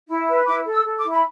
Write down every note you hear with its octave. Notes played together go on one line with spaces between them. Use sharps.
E4
B4
E4 D6
A4
E6
A4
D6
E4
B5